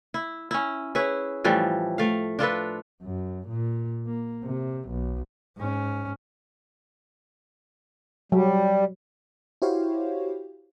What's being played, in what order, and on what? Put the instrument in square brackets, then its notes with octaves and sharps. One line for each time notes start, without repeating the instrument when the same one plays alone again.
[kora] E4
C#4 E4
E4 G#4 B4 C#5
A2 E3 F3 G3
A3 F5
D4 F4 A4 B4
[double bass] F#2
A#2
A#3
C3
B1
G#2 C#4
[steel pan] F#3 [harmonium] G3
[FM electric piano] E4 F#4 G4 C5 C#5 F5